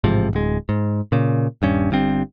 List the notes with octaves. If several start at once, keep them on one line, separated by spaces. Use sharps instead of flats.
A1 G#2 C3 F3
D1 G#3
G#2
A#2 C#3
D#1 G2 C#4
G1 G2 C4